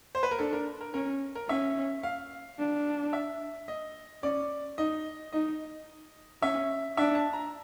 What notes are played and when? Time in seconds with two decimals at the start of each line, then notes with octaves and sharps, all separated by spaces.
0.15 C5
0.23 B4
0.31 A#4
0.39 D4 A4
0.53 A#4
0.81 A#4
0.94 C#4 A#4
1.35 A#4
1.48 C#4 E5
2.03 F5
2.58 D4
3.13 E5
3.68 D#5
4.23 C#4 D5
4.78 D#4 D#5
5.32 D#4 D#5
6.42 C#4 E5
6.97 D4 E5
7.15 A5
7.33 A#5